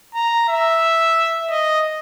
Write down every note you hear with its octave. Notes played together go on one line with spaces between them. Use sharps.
A#5
E5
D#5